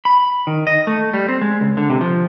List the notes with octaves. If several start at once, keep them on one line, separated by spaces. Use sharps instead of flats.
B5
D#3
D#5
A3
G3
C4
G#3
C#2
D3
C3
F3